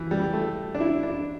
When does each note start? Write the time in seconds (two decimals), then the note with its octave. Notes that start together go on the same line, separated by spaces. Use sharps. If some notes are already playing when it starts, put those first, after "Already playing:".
Already playing: E3
0.11 G3
0.33 A3
0.74 D4
0.80 E4
1.03 D4